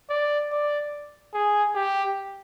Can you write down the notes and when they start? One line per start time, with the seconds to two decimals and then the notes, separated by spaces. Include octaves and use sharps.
0.10 D5
0.52 D5
1.34 G#4
1.75 G4